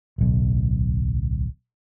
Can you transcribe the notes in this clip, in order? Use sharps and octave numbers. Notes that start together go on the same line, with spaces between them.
D1 B1